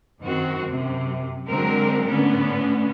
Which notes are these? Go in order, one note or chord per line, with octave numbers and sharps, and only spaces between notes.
F#2 D#3 C4 F#4
F#2 C3
D3 F#3 G#3 C4 A#4
A2 D3 B3 C#4